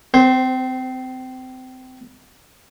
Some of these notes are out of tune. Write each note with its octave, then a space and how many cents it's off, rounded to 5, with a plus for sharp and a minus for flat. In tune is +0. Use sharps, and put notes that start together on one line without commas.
C4 -25 C5 +0